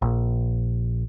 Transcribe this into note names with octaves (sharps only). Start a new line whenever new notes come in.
A#1